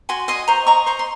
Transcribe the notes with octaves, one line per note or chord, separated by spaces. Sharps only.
F#4 G#5 C6
D#5 G#5 C6
C5 A#5 C#6
D#5 A#5 C#6
C5 A#5 C#6
C6